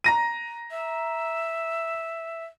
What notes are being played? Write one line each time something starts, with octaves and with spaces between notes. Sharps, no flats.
A#5 A#6 D#7
E5